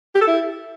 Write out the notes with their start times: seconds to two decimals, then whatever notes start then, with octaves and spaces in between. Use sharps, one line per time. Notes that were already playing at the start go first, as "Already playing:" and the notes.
0.15 G4
0.21 A4
0.27 E4